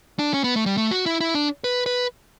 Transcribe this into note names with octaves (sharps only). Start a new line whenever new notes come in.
D4
C#4
B3
A3
G3
A3
F#4
E4
E4
D4
B4
B4